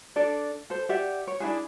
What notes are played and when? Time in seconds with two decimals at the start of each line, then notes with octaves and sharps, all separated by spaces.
0.16 D4 A4 D5
0.70 A4 C5
0.89 G4 D5 E5 F#5
1.27 C#5
1.40 D4 E4 F#4 G#4